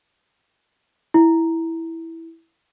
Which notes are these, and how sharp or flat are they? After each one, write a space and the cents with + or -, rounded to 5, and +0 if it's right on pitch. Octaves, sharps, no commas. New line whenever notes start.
E4 -5